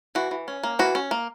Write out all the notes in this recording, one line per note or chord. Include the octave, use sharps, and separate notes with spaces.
E3 F#4
E3
C#4
A#3
E3 F#4
C#4
A#3